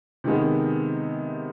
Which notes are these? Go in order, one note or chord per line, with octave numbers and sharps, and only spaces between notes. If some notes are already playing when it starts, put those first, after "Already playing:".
C3 D#3 G#3 B3